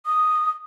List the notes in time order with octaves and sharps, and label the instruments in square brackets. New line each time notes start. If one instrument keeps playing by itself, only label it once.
[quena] D#6